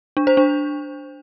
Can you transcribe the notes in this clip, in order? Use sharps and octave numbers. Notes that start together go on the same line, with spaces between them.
D4
C5
D4